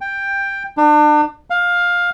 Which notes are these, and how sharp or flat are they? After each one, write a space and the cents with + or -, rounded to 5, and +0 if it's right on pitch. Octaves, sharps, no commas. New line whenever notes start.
G5 +10
D4 +35
F5 +15